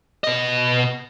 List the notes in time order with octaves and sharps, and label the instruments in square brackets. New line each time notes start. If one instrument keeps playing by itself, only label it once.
[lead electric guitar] B2 D#5